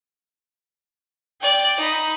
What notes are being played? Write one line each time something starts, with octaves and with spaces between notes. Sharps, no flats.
D5 G5
D#4 B5